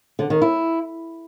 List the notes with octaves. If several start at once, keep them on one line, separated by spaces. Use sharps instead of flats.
D3
D#3
E4